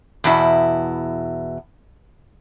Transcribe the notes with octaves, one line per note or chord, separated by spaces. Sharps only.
E2 B2 E4